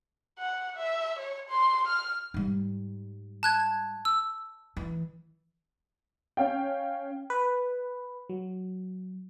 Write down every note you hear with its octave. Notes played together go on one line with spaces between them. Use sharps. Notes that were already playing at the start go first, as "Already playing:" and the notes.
F#5
E5
C#5
C6
F6
G#2 G3
A5 F#6 G#6
E6
E3
C#4 F5 G5
B4
F#3